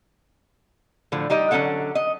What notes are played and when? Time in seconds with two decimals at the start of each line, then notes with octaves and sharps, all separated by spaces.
1.12 A2 D3 F3
1.30 G3 D#4 G4 D#5
1.51 D3 F#3 C#4 E4 A4 F#5
1.95 D#5